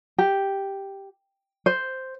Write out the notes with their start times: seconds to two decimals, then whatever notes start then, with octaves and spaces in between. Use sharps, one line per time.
0.18 G4
1.66 C5